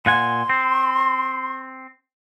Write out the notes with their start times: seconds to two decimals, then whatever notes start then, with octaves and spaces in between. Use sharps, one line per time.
0.06 A#2 F#5 G#5 C6
0.50 C4